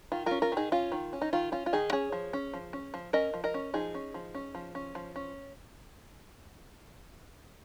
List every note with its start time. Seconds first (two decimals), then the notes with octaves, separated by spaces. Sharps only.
0.12 D#3 F4
0.26 C#4 F4 A#4
0.42 F4 A#4
0.52 D#3 D#4 G#4
0.72 C#4 F4
0.92 D#3
1.13 C#4
1.22 D#4
1.33 D#3 F4
1.52 C#4 F4
1.66 F4
1.73 D#3 D#4 G#4
1.92 C#4 G#4 C#5
2.12 F3
2.33 C#4
2.54 F3
2.73 C#4
2.94 F3
3.13 C#4 A#4 D#5
3.34 F3
3.44 A#4 D#5
3.54 C#4
3.74 F3 D#4 G#4
3.95 C#4
4.14 F3
4.35 C#4
4.55 F3
4.75 C#4
4.95 F3
5.16 C#4